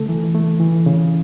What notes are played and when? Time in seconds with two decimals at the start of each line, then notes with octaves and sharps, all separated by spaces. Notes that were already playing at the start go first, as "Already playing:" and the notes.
Already playing: C#3 A3 A4
0.09 E3
0.35 A3
0.60 E3
0.86 C#3